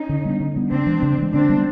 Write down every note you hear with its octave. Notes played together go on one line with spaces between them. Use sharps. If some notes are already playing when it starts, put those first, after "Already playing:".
Already playing: C#4 D#4
D3
G3 B3 D4
D3
G3 B3 D4
C#3 C4 D4
E3 G#3
C#3
E3 G#3
D3 C4 D4
G3 B3